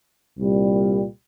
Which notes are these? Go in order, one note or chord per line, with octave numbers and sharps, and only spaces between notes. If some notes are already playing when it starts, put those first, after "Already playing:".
C2 A#2 G3